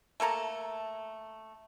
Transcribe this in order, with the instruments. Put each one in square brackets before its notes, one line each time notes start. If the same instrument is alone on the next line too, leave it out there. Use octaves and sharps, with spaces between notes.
[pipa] A3 A#3 A4 A#5